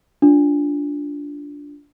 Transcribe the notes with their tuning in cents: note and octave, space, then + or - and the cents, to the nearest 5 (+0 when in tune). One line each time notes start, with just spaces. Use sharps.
D4 -20 F4 +0